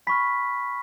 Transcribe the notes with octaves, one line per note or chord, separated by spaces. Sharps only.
G#5 B5 C#6 F6 B6